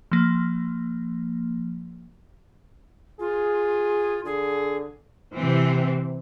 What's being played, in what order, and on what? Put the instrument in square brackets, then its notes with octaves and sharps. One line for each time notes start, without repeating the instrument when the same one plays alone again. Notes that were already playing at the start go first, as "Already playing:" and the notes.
[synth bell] F3 A#3
[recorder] F4 [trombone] G#4
[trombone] D3 [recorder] G#4
[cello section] C3 E3 C4